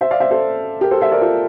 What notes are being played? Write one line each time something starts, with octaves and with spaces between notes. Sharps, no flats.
C5 E5
D5 F5
C5 E5
A4 C5
G4 A#4
A4 C5
C5 E5
A#4 D5
F4 A4